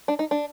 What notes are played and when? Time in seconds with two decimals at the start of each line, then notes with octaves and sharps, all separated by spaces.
0.08 D4
0.19 D#4
0.31 D4